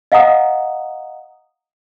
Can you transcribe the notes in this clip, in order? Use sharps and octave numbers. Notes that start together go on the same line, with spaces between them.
D#5 F5 F#5 A#5 D#6